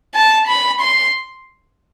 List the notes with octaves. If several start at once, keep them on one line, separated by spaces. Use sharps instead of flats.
A5
B5
C6